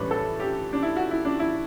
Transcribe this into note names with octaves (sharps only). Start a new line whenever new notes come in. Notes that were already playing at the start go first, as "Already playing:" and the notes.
Already playing: A2 E3 G3 C#4 D4 B4
A4
G4
D4
E4
F#4
E4
D4
E4